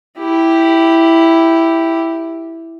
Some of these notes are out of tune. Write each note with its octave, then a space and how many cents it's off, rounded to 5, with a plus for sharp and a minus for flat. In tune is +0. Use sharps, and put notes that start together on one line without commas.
E4 +0 G4 +0